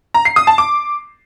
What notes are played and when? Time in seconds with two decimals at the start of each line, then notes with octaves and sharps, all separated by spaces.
0.14 A#5
0.25 C7
0.36 D#6
0.47 A5
0.58 D6